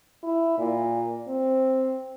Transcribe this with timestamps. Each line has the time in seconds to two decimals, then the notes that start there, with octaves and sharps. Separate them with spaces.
0.23 E4
0.58 A#2
1.27 C4